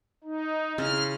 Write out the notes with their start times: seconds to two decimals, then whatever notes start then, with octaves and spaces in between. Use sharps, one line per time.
0.24 D#4
0.78 C#3 G#3 E4 F6